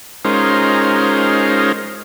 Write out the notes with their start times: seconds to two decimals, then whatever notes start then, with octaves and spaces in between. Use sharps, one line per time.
0.25 G#3 C#4 D#4 F4 A#4 C5